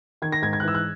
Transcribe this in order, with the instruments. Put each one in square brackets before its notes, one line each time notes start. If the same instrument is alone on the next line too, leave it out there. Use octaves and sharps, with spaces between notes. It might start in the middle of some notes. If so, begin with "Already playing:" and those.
[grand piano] D#3 [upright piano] G#6
[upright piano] A#6
[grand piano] G#2 [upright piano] G#6
[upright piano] G#6
F#6
[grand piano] E3 [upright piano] E6
[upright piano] F#6